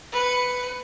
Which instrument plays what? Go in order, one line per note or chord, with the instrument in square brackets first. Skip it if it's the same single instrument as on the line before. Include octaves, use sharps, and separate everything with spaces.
[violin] B4 C#7